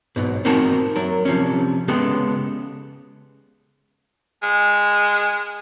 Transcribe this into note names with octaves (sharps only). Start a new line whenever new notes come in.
B1 G#2 B2
C4 D#4 F#4 A#4 G#5 A5
F#3 A#4
C3 F3 C#4
C#3 G#3 B3 G4 A4
G#3